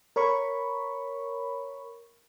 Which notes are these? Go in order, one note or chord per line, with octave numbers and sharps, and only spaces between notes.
A#4 C#5 B5 C#6